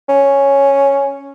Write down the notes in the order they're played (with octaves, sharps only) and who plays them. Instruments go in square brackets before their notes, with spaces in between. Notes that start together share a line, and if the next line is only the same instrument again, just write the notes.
[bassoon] C#4